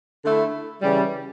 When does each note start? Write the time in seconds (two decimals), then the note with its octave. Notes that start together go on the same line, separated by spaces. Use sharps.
0.24 D3 A3 E4
0.82 C#3 E3 G3